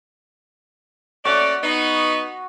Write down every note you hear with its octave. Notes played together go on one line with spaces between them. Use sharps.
A3 C#4 F#4 D5
B3 D#4